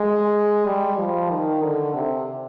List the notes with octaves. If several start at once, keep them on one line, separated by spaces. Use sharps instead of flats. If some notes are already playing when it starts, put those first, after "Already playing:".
Already playing: G#3
G3
F3
D#3
D3
C3